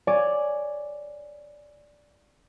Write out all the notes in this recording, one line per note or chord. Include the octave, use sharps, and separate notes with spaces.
C#5 D5 G#5